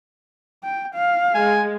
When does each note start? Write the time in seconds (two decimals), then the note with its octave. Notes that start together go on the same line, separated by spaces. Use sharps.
0.63 G5
0.94 F5
1.34 G#3 G#5